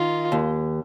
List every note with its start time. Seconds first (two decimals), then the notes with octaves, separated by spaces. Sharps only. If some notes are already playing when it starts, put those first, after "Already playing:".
Already playing: D#3 F4
0.32 D#2